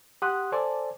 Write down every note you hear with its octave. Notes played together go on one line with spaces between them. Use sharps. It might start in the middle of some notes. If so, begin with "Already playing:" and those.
G4 F#5 G5 C6 D#6 F#6
A4 C5 D5 G#5 A5 D6